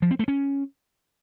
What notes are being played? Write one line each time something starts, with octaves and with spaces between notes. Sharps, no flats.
F3
C4
A3
C#4